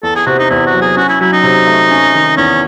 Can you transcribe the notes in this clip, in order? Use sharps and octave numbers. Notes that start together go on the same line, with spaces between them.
E2 A4
G#4
C3 F#4
D#4
E2 E4
F#4
F#3
G#4
C#4 F#4
E4
F#3 E4
D#4
C3
A3
C#4
D#3
E2 C#4